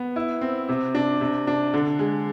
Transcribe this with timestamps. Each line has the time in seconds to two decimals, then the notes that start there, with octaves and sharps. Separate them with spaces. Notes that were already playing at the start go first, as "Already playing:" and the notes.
Already playing: B3
0.16 E4
0.41 C4
0.69 C3
0.95 D4
1.21 C3
1.47 D4
1.74 D3
1.99 G#3